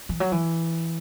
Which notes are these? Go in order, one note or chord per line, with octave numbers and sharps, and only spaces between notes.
E3
F#3
E3